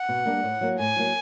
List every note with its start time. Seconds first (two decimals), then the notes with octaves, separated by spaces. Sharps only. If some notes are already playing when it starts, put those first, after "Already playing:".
Already playing: F#5
0.09 B2
0.26 G3 A#3 D4
0.43 A2
0.61 F#3 A#3
0.78 A2 G#5
0.96 F#3 A#3